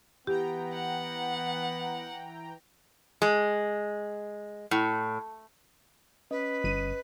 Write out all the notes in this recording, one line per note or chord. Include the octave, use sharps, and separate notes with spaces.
E3 B3 G4 G5 A#5
F#5
G#3
A2
C#4 B4 D#5 D#6
G1 D#7